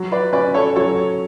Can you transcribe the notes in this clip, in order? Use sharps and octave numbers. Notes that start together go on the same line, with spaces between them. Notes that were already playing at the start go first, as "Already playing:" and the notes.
Already playing: F#3
B4 D5
C#4 B4 D5
A4 C#5
F#3 A4 C#5